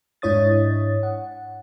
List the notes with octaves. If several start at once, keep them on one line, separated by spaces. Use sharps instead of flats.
G#2 D4 E4 C#5 D#6 A6
F#5